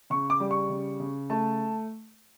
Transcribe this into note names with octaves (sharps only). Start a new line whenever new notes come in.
C#3 C#6
D6
G3
C#6
C#3
C#3
A3 A5